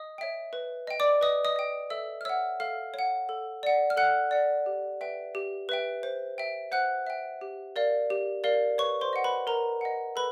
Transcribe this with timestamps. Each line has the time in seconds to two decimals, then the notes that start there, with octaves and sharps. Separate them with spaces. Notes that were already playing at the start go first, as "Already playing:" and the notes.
Already playing: D#5 D#6
0.18 C#5 E5 G5
0.53 B4
0.87 D#5 G5
1.00 D5 D6
1.21 B4 D#5 D#6
1.45 D#5 D#6
1.56 D#5 G5
1.90 A4 E5 E6
2.21 F6
2.25 C#5 E5 F#5 E6
2.60 A4 F5 F6
2.94 C#5 F#5
3.29 A4
3.63 D5 F#5
3.90 F6
3.97 A4 F#5 F#6
4.31 D5 F#5
4.66 G4
5.01 B4 E5 G5
5.35 G4
5.69 B4 E5 G5
6.03 C5
6.38 E5 G5
6.72 C5 F#5 F#6
7.07 E5 G5
7.41 G4
7.76 A#4 D5 F5
8.10 G4
8.44 A#4 D5 F5
8.78 B4 C#5 C#6
9.01 C5 C6
9.13 D#5 F#5
9.24 B4 B5
9.47 A#4 B4 A#5
9.81 D#5 F#5
10.16 A4 B4 B5